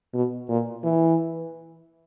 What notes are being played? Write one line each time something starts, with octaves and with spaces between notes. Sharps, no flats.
B2
A#2
E3